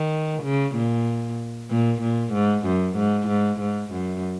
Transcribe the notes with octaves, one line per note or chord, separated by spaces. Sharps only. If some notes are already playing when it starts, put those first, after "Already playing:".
Already playing: D#3
C#3
A#2
A#2
A#2
G#2
F#2
G#2
G#2
G#2
F#2